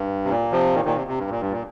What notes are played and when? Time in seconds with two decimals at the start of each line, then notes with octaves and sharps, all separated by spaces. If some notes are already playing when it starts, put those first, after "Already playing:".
Already playing: G2
0.24 C3
0.30 A#2
0.52 C3 F3
0.74 A#2 D#3
0.85 A#2 D#3
0.96 C3
1.07 C3
1.18 G2
1.30 A#2
1.41 G2
1.51 A#2